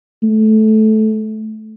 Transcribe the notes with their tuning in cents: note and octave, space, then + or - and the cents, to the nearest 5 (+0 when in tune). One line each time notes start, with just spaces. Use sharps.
A3 -15